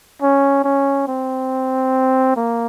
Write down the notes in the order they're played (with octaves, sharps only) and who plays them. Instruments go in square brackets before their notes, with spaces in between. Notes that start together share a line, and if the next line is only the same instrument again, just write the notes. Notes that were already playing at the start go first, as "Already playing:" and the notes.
[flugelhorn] C#4
C#4
C4
A#3